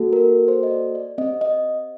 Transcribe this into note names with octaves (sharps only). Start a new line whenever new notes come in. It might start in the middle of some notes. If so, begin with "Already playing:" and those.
Already playing: A#3 F#4 A4
A#4
C5
D#5
D5
D5
C4 G4 D#5
D#5